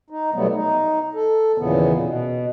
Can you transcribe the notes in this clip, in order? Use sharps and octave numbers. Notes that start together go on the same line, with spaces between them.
D#4
B2 F#3 G3 A3 B3
D#4
A4
D#2 A#2 C#3 E3 B3
B2